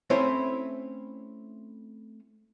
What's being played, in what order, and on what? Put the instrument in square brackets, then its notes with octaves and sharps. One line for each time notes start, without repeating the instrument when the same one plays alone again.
[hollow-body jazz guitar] A3 C4 C#4 E4 C5 C#5